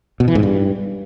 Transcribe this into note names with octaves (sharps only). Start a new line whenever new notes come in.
B2
E3
G#2
G2